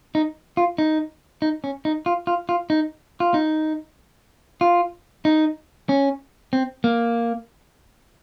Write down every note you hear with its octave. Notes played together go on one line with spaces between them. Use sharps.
D#4
F4
D#4
D#4
C#4
D#4
F4
F4
F4
D#4
F4
D#4
F4
D#4
C#4
C4
A#3